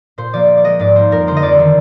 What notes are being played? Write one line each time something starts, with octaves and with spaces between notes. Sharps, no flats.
A#2 C5
F3 A#3 D5
A#2
D5
G#3 D#5
G#2 D5
G3 A#3 C5
F2 A#4
D3 G#3 C5
D#5
F2 D5
D#3 A#3